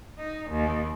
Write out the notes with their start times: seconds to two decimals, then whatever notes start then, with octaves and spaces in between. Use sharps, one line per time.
0.18 D#4
0.50 D#2